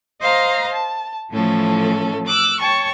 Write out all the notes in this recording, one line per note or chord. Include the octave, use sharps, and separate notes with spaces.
C5 D#5 F5 A#5
A5
A2 E3 F3 A3 C#4 A4
D6 E6 F#6
C#5 G5 A5 C#6